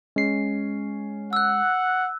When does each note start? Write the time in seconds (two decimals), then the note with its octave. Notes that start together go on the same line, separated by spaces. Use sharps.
0.16 G#3 C#4 C7
1.33 F#5 E6 F#6